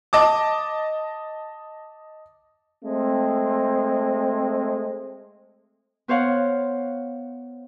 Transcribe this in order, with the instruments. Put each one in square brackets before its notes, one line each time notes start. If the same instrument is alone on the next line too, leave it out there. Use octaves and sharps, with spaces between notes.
[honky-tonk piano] D#5 A5 D6
[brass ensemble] G#3 A3 C4
[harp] B3 C5 C#5 F5 F#5